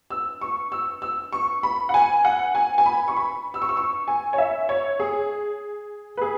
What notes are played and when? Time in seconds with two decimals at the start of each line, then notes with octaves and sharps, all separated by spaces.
0.10 E6
0.41 C#6
0.72 E6
1.02 E6
1.33 C#6
1.63 B5
1.89 F#5
1.94 G#5
2.25 F#5
2.55 G#5
2.78 G#5
2.86 B5
3.08 C#6
3.17 B5
3.54 E6
3.62 C#6
3.69 E6
3.77 C#6
4.08 G#5
4.33 C#5
4.38 E5
4.69 C#5
5.00 G#4
6.17 B4
6.21 G#4